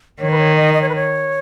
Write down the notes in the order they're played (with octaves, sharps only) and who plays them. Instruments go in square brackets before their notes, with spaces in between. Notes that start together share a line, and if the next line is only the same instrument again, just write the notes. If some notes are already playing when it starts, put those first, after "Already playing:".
[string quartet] D#3 [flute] C#5
[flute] B4
C#5
D#5
D#5
C#5
B4
C#5